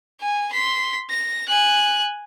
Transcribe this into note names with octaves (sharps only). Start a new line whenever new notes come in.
G#5
C6 B6
A#6
G#5 F#6